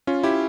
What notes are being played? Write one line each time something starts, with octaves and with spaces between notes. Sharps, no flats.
C#4 F4
E4 G4